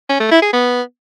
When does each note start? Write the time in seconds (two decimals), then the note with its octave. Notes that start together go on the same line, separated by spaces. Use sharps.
0.09 C#4
0.20 A3
0.31 E4
0.42 G#4
0.53 B3